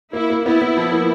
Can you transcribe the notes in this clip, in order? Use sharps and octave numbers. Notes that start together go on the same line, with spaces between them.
A#3 E4
A#3
B3 E4
B3
F3
A#3